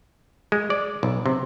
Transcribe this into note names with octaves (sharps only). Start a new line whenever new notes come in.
G#3
D5
B1
C3